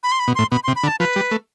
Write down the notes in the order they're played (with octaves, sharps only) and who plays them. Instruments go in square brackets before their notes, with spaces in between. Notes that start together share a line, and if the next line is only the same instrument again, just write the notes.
[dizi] B5
C6
B5
[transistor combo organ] B2
[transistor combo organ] A2 [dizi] C6
[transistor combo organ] B2 [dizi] B5
[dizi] C6
[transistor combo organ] C3
[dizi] B5
[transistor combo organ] D3
[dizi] A5
[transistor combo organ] F3 [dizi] B4
[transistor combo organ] G3
A3